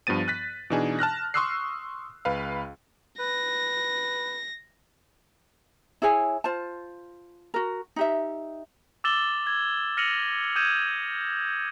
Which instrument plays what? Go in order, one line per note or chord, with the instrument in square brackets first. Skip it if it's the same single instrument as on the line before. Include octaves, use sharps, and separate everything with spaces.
[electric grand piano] G2 F3 B3 A6 D#7
F#6 A6 B6
B2 E3 D4 D#4 G#4
A5 F6 F#6 A#6
C6 C#6 D#6 E6 F#6 C7
C#2 B4 F5
[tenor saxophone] B4 [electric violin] A#6
[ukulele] E4 G#4 C#5 G#5
F4 C5 A5
F#4 A#4
D#4 G4 E5
[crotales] D6 E6 A6 E7 F#7 G7
G#6
F6 A#6 C#7 D#7 F7 F#7
D#6 G6 G#6 D#7 E7